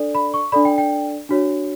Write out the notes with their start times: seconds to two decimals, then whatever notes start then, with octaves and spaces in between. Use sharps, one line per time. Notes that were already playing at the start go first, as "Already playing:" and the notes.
Already playing: D4 A4 D5
0.15 B5
0.34 C#6
0.52 D4 A4 D5 B5
0.65 G5
0.78 G5
1.29 D4 F#4 C#5